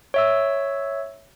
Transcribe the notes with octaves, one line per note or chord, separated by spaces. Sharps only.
C#5 E5 E6